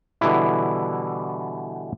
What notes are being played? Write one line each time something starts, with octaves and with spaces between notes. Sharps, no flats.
B2 D3 E3 G3 E4